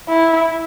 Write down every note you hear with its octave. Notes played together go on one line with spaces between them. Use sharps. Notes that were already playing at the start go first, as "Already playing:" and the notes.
E4